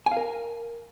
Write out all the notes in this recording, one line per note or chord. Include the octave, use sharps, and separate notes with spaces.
G#5
F5
A#4